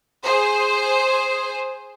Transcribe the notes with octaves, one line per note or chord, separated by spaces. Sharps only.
G#4 C5